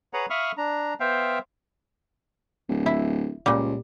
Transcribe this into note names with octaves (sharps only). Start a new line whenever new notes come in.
G#4 B4 C#5 F#5 A#5
E5 F5 B5 C#6 D#6 F6
D4 A#5
B3 C5 E5 F5 G5
D1
E4
C#2 A#2 G3